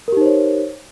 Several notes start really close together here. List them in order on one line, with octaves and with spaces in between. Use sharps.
A#4 G4 D#4 C5 C#5